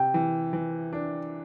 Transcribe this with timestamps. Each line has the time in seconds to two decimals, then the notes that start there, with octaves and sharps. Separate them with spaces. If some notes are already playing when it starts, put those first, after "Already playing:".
Already playing: C3 G5
0.14 E3
0.53 E3
0.93 D4